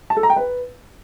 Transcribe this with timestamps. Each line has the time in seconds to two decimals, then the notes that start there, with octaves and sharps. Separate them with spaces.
0.10 A5
0.17 A4
0.23 A#5
0.30 G5
0.36 B4